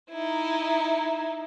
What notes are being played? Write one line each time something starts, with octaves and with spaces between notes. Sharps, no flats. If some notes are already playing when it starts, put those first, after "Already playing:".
D#4 E4